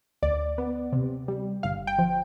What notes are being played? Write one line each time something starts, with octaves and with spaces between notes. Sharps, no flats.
D2 D5
B3
C3
G3
G1 F5
G5
F3